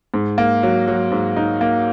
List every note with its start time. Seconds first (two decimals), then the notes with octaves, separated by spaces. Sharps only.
0.14 G#2
0.38 A#3
0.63 F#3
0.88 F#3
1.11 G#2
1.36 D#4
1.61 A#3